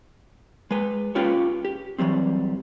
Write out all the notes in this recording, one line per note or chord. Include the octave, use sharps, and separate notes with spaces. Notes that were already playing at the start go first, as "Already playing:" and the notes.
G#3 B4
C#4 F4 G4 B4 C#5
G4
E3 F#3 G3 C4